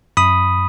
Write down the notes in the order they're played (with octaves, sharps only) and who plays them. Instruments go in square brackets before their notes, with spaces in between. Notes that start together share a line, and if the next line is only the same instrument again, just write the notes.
[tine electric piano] F#2 B5 D#6